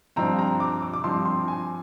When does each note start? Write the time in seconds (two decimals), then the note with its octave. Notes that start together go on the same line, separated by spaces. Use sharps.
0.16 G2 F3 C4 A#5
0.39 A#5
0.60 D6
0.82 D6
0.94 D6
1.04 G2 F3 C4 C6
1.26 C6
1.48 G#5